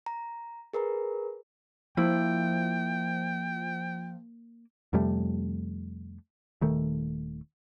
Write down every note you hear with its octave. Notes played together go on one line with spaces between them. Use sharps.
A#5
G#4 A#4 B4 A#5
F3 A#3 E4 G5
F2 C3 G3 A3
D#1 D#3 A3